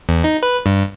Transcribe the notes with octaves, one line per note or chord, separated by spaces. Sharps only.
E2
D#4
B4
G2